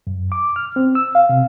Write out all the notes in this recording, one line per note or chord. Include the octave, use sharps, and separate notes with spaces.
F#2
D6
F6
C4
E6
F5
C3